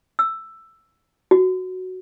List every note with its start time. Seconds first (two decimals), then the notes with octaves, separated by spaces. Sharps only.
0.19 E6
1.31 F#4